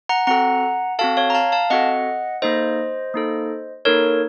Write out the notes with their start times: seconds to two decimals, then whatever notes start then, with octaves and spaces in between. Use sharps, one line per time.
0.09 F#5 A#5
0.27 C4 F#4 A4 F#5 A#5
0.99 C4 F#4 A4 F5 A5
1.17 C#5 F5
1.30 A#5
1.35 F5 A5
1.52 F5 A5
1.70 C4 F#4 A4 D#5 F#5
2.42 A#3 D#4 A4 C5 D#5
3.14 A#3 D#4 A4
3.85 A#3 D#4 A4 A#4 C#5